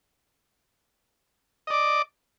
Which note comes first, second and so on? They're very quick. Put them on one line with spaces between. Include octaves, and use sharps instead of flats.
D#5 D5 D6